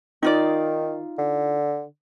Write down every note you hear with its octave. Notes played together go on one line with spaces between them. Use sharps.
D#3 D#4 F4 D5
D3